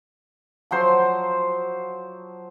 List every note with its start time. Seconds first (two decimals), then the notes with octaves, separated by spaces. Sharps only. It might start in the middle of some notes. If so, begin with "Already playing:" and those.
0.71 F3 F#3 C5 C6